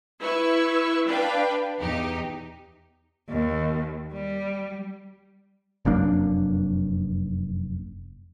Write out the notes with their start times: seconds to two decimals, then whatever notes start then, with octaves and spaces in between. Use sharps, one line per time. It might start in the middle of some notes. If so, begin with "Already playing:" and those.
0.22 E4 B4 C#6 E6
1.07 D4 B4 F5 G5
1.79 E2 D#4 G4
3.29 D#2
4.13 G3
5.85 F1 F#2 A#3 D4